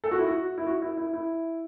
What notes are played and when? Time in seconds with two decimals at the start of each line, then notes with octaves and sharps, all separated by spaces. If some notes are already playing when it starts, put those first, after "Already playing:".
0.04 A4
0.11 F#4
0.19 E4
0.27 F#4
0.58 E4
0.67 F#4
0.82 E4
0.97 E4
1.13 E4